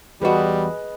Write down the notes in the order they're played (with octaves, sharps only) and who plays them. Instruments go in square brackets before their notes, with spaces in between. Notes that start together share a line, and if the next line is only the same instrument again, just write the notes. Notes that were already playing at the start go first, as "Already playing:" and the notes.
[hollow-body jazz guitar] E2 F#4 [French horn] G3 [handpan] G#4 B4 D#5